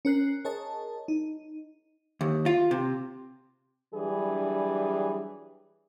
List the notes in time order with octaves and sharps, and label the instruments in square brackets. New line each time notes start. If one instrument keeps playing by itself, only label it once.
[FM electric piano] C#4 A#4 F#6 C7
G#4 A#4 C#5 D#5 A5
D#4
[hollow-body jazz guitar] D#2
F4
C3
[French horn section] E3 F#3 G3 D4 G#4